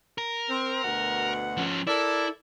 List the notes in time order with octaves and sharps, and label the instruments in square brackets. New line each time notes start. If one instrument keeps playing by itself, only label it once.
[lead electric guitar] A#4
[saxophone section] C4
D2 B2 F#5
[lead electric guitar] F3 C#4
[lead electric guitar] E4 [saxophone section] A4 A#4 D5